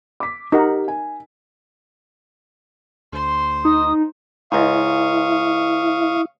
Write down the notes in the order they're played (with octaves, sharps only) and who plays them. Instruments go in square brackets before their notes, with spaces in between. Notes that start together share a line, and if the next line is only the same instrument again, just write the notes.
[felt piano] D6 B6
[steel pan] D#4 A#4 F#5 [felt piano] G4
[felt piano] G#5
[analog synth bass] D2 [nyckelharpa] C5 C6
[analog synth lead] D#4 [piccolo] D#6
[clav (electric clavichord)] C#2 G#2 [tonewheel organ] E4 [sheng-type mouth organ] F5 C#6 D#6